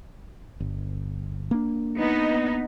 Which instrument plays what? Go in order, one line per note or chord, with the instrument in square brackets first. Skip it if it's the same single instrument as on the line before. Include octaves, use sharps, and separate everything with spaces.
[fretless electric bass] G1
A#3 D4
[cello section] B3 D#4